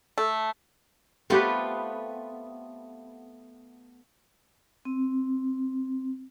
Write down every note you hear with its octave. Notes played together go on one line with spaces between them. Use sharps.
A3
A3 B3 C4 F4 G4 B4
C4